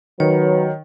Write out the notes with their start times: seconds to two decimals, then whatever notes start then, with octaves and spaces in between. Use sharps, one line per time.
0.20 D#3 F#3 B4 C#5